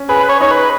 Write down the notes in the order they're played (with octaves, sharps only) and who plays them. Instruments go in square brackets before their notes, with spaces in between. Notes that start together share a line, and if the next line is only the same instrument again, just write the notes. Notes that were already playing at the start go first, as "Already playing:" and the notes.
Already playing: [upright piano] C#4
[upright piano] G#4 [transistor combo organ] B4
[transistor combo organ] C#5
[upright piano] D#4 [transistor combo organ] C#5
[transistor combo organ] B4